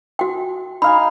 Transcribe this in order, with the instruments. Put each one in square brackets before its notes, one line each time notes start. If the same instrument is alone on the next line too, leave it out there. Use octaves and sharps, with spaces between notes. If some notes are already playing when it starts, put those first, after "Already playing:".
[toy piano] F#4 G5
[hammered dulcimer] D#4 F5 G#5 [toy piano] B5